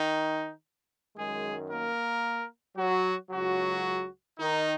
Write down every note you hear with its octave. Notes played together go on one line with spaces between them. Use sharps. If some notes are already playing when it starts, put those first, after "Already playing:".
Already playing: D#3 D#4
F#2 D#3 G#3 G#4
A#3 A#4
F#3 F#4
C#2 C#3 F#3 F#4
D#3 D#4